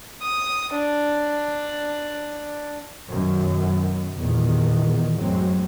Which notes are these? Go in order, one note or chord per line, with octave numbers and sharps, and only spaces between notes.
D#6
D4
B1 F#2 D#3
E2 A#2 D#3
A1 F#2 F#3 G#3 C4